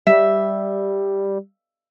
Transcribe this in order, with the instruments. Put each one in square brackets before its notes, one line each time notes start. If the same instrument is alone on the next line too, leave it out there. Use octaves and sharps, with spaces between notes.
[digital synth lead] G3 [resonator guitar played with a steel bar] E5